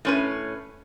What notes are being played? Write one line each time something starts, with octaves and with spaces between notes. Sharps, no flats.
A2 C#4 B4